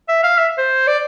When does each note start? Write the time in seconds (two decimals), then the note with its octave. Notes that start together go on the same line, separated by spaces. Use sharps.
0.09 E5
0.23 F5
0.38 E5
0.58 C5
0.87 D5